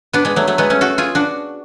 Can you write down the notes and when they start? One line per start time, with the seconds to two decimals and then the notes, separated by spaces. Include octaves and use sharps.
0.13 B3 D4
0.25 G#3 B3
0.36 F#3 A3
0.47 F#3 A3
0.58 G#3 B3
0.70 A3 C#4
0.81 F#4 A4
0.98 F4 G#4
1.15 D4 F#4